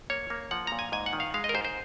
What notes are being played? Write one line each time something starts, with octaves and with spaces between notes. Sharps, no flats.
A#3 C#5
A#3
F3 F#5
A#2 A#5
G#5
G#2 G#5
F#5
D#3
F5
G#3 F5
D#5
A#4
G#2 C5
C5